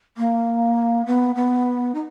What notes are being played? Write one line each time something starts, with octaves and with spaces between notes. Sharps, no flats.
A#3
B3
B3
D#4